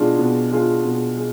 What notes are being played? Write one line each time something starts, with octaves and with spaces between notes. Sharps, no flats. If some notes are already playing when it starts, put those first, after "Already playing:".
Already playing: B2 G#3 D4 F4
B2
G#3 D4 F4
B2
G#3